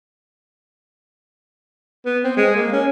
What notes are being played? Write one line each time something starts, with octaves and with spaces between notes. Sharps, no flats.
B3
C4
G#3
A#3
C#4